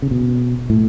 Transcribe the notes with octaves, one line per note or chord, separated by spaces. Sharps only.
C#3
B2
A2